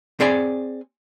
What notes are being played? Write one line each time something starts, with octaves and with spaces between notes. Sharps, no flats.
C4 G#4 D5 G#5